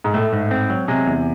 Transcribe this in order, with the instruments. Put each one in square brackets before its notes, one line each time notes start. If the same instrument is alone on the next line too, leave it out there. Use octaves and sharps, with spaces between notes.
[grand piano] G#2
[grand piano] A2 [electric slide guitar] A3
[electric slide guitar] G#2
C4
F#3
[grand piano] C3 [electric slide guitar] G#3
[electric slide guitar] E2